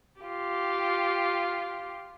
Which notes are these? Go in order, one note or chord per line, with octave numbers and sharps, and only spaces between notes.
F4 G4